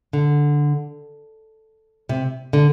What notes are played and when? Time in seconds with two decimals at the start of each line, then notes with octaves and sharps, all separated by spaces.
0.13 D3
2.09 C3
2.53 D3